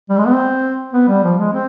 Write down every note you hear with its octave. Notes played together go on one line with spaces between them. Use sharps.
G3
G#3
B3
C4
B3
G3
F3
G#3
C4